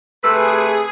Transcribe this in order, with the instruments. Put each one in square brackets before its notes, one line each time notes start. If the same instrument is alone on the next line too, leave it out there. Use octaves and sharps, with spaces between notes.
[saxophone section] C3 A3 B4 [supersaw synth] G#4 [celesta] E6